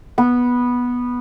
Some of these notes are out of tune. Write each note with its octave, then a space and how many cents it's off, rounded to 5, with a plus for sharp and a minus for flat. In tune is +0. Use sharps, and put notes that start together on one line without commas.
B3 -10